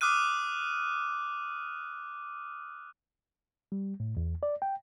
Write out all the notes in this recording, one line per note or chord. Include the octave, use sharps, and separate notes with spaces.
D6 D#6 F6 F#6 D#7
G3
A2
E2
D5
G5